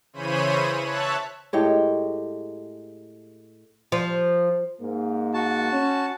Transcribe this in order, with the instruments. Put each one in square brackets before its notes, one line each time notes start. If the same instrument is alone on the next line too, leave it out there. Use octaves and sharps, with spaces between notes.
[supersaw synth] C#3 E3 C5 C#5 B5 D#7
C#5 E5 A5 F#6
[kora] A2 G#3 G4 C#5
[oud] F3
[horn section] G#2 A#3
[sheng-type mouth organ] F#4 A5
[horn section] C#4